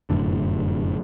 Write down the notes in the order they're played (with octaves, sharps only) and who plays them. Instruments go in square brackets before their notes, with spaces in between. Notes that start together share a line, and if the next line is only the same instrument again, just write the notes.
[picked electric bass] F1 F#2 A2 D3